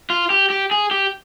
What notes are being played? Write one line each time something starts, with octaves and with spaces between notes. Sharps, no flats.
F4
G4
G4
G#4
G4